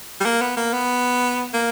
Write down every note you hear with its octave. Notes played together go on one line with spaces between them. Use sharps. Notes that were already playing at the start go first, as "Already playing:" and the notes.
G3
A#3
B3
A#3
B3
A#3